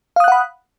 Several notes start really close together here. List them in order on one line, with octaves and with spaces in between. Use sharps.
F5 D#6 F#6 F#5 B5